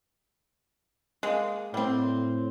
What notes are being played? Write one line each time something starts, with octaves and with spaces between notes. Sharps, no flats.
G#3 A#3
A2 G3 C4